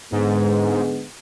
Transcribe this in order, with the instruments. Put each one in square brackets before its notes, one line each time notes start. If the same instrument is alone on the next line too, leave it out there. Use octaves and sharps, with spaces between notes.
[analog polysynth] G#2 [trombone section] D3 G#3 B3